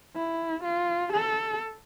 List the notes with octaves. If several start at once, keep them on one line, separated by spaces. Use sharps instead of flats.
E4
F4
A4